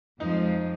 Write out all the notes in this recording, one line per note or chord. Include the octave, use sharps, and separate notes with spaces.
F2 F3 G#3 D#4